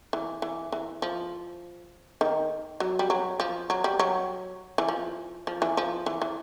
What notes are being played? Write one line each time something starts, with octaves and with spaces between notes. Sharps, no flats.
E3
E3
E3
F3
D#3
F#3
G3
F#3
F3
F#3
G3
F#3
E3
F3
F3
E3
F3
E3
E3